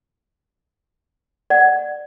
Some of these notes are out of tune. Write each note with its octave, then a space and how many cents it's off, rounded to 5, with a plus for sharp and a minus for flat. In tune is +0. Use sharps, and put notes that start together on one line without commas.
D5 +15 F#5 +10